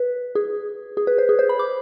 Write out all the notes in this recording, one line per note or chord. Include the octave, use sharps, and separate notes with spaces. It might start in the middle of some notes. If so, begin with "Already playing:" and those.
Already playing: B4
G#4
G#4
B4
C5
G#4
C5
B5
D6